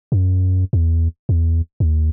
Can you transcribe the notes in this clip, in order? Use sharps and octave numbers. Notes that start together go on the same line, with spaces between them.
F#2
E2
E2
D#2